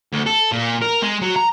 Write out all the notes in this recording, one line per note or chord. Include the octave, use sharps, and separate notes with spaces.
D2
A4
A#2
A#4
G#3
F#3
A#5